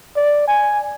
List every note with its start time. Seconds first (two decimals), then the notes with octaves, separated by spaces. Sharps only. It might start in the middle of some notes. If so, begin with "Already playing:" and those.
0.16 D5
0.48 G#5